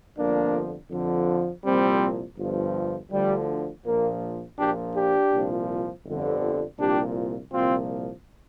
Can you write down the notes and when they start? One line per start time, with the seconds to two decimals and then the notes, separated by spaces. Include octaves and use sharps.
0.17 G1 F2 D3 F3 A#3 D4
0.91 F2 D3 F3
1.64 C2 A#2 F3 G3 C4
2.38 G1 G2 F3
3.11 D2 D3 F3 G3
3.85 A#1 A#2 F3 A#3
4.58 A#1 A#2 F3 D4 G4
4.95 D4 G4
5.31 C2 A#2 F3
6.05 G1 F2 D3
6.79 C2 A#2 F3 D4 G4
7.52 C2 A#2 F3 C4 F4